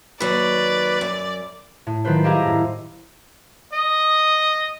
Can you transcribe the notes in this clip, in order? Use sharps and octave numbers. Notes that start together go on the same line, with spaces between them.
D#2 F#3 B4 D5
F#2
A2
D#3 F#3 F4 B4 C5
E4 G4 G#4 D#5 F5 A#5
F#2 A2
D#5